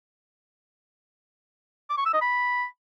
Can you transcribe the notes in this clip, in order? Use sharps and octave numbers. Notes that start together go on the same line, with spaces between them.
D6
C#6
E6
D#5
B5